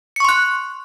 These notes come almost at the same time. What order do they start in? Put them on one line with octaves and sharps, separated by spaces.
C#7 C#6 C6 F#6